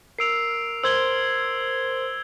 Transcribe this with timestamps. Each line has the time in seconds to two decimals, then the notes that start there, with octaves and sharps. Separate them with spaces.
0.19 A#4 E6 C7 D7 F7
0.83 A#4 C5 C6 E6 G#6 G7